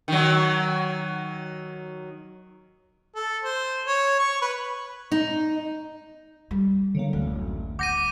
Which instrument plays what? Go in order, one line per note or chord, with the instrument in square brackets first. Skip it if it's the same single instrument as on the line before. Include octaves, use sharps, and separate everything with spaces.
[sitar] D#3 F#3
[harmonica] A4
C5
C#5
C#6
B4
[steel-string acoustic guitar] D#4
[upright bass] G3
[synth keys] D3 F#3 A#3
[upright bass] D1 [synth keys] A1 F#2
[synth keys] G1 F#5 G6 [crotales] D6 A#6 D#7